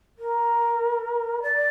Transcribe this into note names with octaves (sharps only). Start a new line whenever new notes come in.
A#4
D5